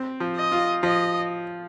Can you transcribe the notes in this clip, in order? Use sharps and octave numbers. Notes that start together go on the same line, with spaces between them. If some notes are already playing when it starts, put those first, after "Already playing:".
Already playing: C4
F3
D#5
F4
F3 D#5